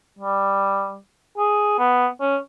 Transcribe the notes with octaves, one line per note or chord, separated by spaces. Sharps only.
G3
G#4
B3
C#4